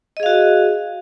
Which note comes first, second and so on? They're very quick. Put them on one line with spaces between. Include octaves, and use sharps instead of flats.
D#5 G#4 F5 F#4